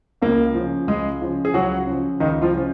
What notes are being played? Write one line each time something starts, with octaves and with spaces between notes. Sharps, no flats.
C#2 A#3
C#3 F3
C#2 G#3 G#4
C#3 F3
G#4
C#2 F#3 F#4
C#3 F3
C#2 D#3 D#4
F3 F4
C#3 F3